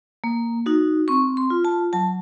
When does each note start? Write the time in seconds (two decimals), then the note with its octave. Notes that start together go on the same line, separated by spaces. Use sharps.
0.24 A#3
0.66 D#4 F#4
1.08 C4 C#6
1.37 C6
1.50 F4
1.65 A5
1.93 F#3 A5